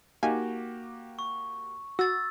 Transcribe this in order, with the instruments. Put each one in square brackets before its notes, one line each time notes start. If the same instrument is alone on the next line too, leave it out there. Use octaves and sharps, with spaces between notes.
[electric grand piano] A#3 F#4 G4 [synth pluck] D#4 F5 G#5
[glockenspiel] C#6
[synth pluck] F#4 [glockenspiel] E6 A6